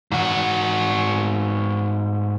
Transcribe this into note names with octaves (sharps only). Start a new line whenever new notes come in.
G#2 F#4